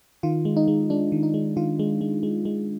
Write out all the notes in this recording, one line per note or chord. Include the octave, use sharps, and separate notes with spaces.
D#3 F4
G#3
D#4
G#3
G#3 D4
D#3
D#4
G#3
D#3 F4
G#3
G#3
G#3
G#3